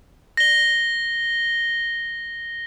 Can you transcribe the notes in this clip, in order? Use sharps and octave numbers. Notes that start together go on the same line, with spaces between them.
A#6 G7